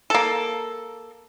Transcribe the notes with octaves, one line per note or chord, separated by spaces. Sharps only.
A#3 A4